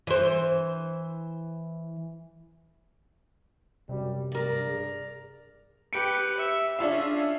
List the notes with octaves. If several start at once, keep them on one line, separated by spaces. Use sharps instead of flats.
E3 C5
F#2 C3 F#3 G3
G2 A#4 D5
G#4
G4 B4 C#7 D7
E5
C#4 D4 F4 G#4 E5